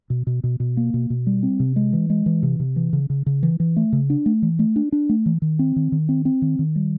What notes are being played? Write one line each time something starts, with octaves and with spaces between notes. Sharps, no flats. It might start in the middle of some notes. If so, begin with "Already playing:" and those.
B2
B2
B2
B2
A#3
B2
B2
G3
C4
C3
G#3
E3
G#3
E3
C3
C3
E3
C#3
C#3
C#3
E3
E3
A3
C#3
D4
A3
E3
A3
D4
D4
A3
E3
D#3
C4
D#3
D#3
C4
C4
D#3
D#3
G3